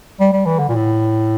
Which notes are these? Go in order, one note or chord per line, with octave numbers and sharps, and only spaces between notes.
G3
G3
E3
D3
A#2
A2